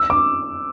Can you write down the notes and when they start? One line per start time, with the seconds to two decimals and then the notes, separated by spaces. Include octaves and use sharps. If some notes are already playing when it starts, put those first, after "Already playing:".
Already playing: E6
0.10 D6